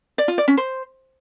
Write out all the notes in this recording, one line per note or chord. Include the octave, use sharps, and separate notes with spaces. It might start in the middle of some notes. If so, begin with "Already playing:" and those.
D5
F4
D5
C#4
C5